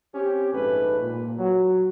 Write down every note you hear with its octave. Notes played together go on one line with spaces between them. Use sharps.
C4 C#4 G4
A#1 G#2 A3 B4
A#2
F#3